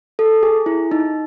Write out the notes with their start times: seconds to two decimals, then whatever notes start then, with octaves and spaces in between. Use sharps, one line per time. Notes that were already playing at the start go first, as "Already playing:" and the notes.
0.19 A4
0.43 G#4
0.66 E4
0.91 D#4